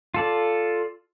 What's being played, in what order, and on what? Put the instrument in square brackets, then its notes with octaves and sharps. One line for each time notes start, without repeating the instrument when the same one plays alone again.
[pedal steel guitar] F4 A4 D5